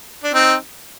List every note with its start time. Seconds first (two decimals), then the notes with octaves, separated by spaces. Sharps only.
0.24 D4
0.34 C4 D#4